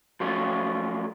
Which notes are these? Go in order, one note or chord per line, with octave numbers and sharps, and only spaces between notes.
F3 F#3 A3 C#4 F4